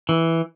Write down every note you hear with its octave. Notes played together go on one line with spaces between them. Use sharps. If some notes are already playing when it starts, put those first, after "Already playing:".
E3